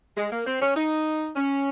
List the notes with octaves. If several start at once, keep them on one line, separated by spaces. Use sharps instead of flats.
G#3
A#3
C4
C#4
D#4
C#4